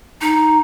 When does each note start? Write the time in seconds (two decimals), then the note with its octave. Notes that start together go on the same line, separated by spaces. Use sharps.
0.21 D#4